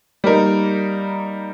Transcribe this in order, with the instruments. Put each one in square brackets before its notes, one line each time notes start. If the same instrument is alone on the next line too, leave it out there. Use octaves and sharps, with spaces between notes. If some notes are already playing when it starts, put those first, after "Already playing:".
[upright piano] G3 A#3 D#4 A#4